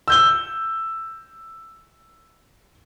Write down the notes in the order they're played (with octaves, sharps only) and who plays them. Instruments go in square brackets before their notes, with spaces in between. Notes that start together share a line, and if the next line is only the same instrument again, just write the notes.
[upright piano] E6 G6 G7